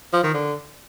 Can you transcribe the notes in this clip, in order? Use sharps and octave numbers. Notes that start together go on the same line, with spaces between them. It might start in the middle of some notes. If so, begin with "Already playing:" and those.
F3
D#3
D3